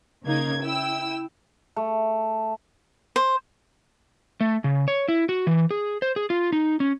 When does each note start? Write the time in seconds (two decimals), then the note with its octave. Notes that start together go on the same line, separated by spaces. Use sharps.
0.24 C#3 A#3 D#4 G#6
0.62 E4 G5 E6
1.76 A3
3.16 C5
4.41 A3
4.64 C#3
4.88 C#5
5.08 E4
5.29 F#4
5.47 E3
5.71 G#4
6.02 C5
6.16 G#4
6.30 F4
6.52 D#4
6.80 C#4